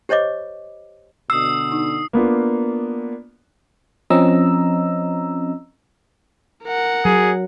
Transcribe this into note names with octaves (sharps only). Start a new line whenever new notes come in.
G4 C5 C#5 D#5 D6
B2 D3 D#6 E6 C7
D#4
A#3 B3 D4 F4
F3 C4 C#4 D#5 A#5 E6
A#4 F#5
F#3 G#4